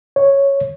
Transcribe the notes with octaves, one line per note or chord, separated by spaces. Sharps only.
C#5